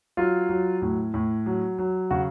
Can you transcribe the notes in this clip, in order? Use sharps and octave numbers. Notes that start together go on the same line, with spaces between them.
F#3 F4
F#3
A2
A2
F#3
F#3
C#3 F#4